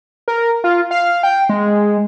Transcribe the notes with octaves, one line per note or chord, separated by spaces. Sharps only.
A#4
F4
F5
G5
G#3